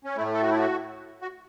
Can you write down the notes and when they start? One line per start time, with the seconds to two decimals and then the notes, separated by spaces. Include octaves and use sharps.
0.05 C#4
0.17 A3 E4
0.20 A2
0.34 A4
0.42 F#4
0.50 E4
0.57 F#4
1.22 F#4